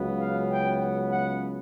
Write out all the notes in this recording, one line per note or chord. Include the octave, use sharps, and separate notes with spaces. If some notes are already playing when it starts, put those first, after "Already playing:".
Already playing: C#2 C#3 F#3 B3
F5
G5
F#5
F#5